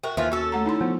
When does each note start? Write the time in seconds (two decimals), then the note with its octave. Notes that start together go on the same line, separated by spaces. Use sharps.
0.03 F#4 A#4 E5 G5
0.17 D#2 E3 F3 F4
0.32 C#4 F#4 A4
0.52 A3 F#5 A#5
0.66 D#4 E4 C6
0.81 F3 B3